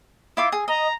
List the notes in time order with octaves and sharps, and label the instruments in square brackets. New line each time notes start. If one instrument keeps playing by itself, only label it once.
[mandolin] E4 F4 D6
G#4
[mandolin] D#5 [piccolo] A#5